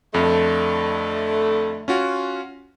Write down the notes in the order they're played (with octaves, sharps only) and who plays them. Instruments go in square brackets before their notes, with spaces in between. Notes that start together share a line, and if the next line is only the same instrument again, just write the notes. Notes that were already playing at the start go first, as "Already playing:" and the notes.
[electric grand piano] F2 [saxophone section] D3 A3
[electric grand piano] C#4 F4 F#4